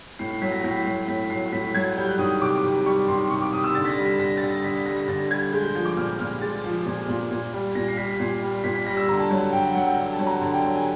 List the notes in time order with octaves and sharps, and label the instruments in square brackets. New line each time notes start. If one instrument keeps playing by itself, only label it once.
[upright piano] A2 C7
C7
F#3 B6
A#6
A2 B6
F#3 C7
A2 B6
F#3 C7
A2 B6
F#3 G#6
G3 G6
F#6
D#3 D#6
C3 D6
C3
G3 C#6
D#3 C6
C3 C#6
D6
C3 D#6
E6
D3 A6
B6
A#6
G3
B6
D3 A#6
A6
G3 A#6
D3 B6
G3 A#6
A#6
D3 A6
G3 G#6
G#3 G6
G6
F3 G6
D6
A#2 F6
A#2 F6
G#3 A6
F3
A#2
A#2
A#2
G3
A#2 A#6
C7
G3 B6
A#2 C7
G3
A#2 B6
B6
G3 A#6
E6
D3 A#5
A5
F#3
D3 G5
F#5
F#3 F#5
G5
D3
A5
F#3
A#5
D3 A5
G5
F#3
G#5